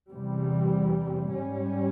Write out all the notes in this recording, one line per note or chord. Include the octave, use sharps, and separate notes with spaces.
E2 C3 G3
G#2 G3 C#4